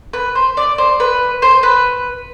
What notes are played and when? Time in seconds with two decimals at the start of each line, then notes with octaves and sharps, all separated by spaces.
0.13 B4
0.35 C5
0.57 D5
0.78 C5
1.00 B4
1.42 C5
1.63 B4